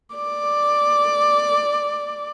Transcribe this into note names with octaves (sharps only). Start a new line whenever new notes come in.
D5 D6